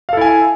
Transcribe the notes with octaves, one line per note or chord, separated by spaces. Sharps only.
E4 A4 F5 G#5